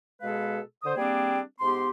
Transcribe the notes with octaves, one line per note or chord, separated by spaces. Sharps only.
B2 G#3 G#4 A4 B4 F5
D3 C5 D#6
G3 A#3 C4 D4 G#4 G5
G#2 B3 G4 C6